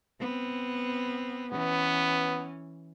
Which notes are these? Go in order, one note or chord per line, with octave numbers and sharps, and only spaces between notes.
B3 C4
E3 B3 C#4